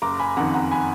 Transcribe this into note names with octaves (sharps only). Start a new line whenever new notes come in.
F#1 A#5 D6
G#5 B5
F2 D#3 F#5 A#5
F#5 A#5
G#5 B5